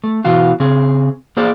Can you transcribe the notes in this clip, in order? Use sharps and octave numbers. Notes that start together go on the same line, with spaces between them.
A3
B2 E3 F4 F#4
C#3 C4 G#4
A#3 F4 G#4 C5 D5